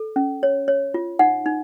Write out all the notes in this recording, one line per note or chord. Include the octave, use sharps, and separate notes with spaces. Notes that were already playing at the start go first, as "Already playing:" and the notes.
Already playing: A4
C#4
C#5
C#5
F4
D#4 F#5
D#4